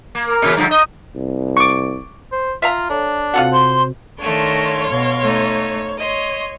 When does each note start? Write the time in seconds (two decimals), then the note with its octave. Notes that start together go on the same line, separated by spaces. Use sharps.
0.15 A#3
0.27 A#4
0.42 A#2 C#3 E3
0.57 G2 D3 F3
0.71 D#4 D#5
1.16 C2
1.57 C#6 D6
2.32 C5
2.62 F4 E5 F5 A#5
2.90 D4 A4 C#5
3.34 C3 C4 F4 F#4 A4 F#5
3.52 C5 C6
4.20 D#3 A3 D4 C#5 F5 C6
4.90 B2
5.23 A3 D#4
5.99 C#5 D#5 C6